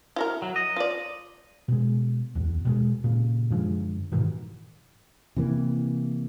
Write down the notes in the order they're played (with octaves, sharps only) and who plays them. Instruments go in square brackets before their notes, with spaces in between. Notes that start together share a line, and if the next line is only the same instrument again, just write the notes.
[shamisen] E4 F#4 A#4
[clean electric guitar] F#3
D#5
[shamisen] F4 D5
[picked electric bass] B2 G#3
D1 E2
B2 G3 G#3
A#2 C#3
F#2 D3 F3 G#3
G#2 B2 D#3 E3
[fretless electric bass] C3 E3 A#3